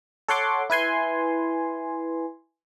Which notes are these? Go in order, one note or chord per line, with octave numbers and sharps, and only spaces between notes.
A4 C#5 F#5 C6 D6
E4 B4 G#5 C6